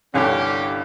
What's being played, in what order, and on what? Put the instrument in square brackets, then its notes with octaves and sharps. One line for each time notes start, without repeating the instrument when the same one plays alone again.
[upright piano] G1 C2 D3 [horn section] C#4 G4